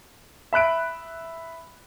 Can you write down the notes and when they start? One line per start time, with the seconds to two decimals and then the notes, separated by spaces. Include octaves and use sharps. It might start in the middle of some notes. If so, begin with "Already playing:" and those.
0.53 E5 B5 F#6 D7